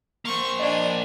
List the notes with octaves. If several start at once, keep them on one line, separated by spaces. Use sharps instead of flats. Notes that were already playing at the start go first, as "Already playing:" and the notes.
A#3 C5 C#6
D4 D5 D#5 G#5